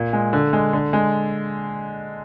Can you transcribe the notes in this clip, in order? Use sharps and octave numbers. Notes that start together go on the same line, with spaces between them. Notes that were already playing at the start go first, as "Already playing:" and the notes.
Already playing: A#2
G#3
D3
G#3
D3
G#3